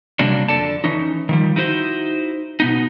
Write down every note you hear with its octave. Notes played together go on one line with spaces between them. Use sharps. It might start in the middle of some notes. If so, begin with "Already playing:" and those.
C3 F#3 G3 A#3 D4
F2 D3 A4 D5 A5
E3 C#4 D#4
D#3 F3 G3
D#4 E4 F#4 A#4 C5
B2 B3 D#4